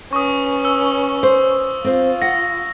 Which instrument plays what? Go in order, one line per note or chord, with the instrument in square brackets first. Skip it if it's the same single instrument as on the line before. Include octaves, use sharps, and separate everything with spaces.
[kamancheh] C#4 B4 [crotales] C#6 D#6
[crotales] E6
[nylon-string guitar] C5
[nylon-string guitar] C4 C5 [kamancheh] F4
[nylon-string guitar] F#5 [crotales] A#6